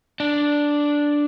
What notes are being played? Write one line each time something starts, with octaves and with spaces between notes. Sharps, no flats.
D4